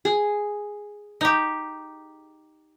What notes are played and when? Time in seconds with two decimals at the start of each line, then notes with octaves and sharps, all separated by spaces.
0.05 G#4
1.21 D#4 G4